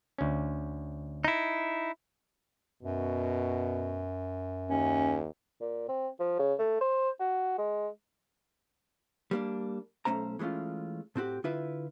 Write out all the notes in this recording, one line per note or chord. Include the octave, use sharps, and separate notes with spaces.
D2 C#4
D#4 E4
F#2 B2
D#2 C#4
A#2
C4
F3
C#3
A3
C5
F#4
G#3
G3 A#3 D4
B1 D3 A3 C#4 C5 A#5
E3 G#3 A3 C#4 F4
A2 C4 F#4 G4
D3 E4 F4 B4 E5